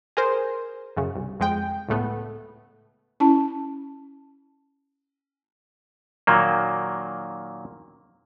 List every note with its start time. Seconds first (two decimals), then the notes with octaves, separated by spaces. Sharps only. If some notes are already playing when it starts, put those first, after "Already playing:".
0.17 G#4 A#4 C5
0.97 F#2 C#3
1.15 C2
1.40 F2 G#3 G5
1.88 C#2 A2 A3 B3
3.20 C#4 E4 A5
6.27 A#2 D#3 F#3 A#3